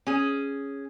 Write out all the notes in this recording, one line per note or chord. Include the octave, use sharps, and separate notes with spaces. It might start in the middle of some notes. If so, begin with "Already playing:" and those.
C#4 G#4